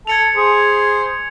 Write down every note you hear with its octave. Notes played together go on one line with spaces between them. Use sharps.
A4 G#6 C#7 F7
G#4 C5